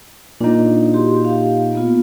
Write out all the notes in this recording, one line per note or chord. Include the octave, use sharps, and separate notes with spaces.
A#2 D4 D#4
F#4 G4 C6
G4 F5
A#3 B3 F4